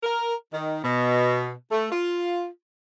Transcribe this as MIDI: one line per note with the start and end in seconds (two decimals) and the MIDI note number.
0.03 0.33 70
0.52 0.80 51
0.83 1.50 47
1.70 1.90 57
1.92 2.46 65